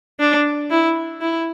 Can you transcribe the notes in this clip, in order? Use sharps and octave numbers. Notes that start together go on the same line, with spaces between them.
D4
E4
E4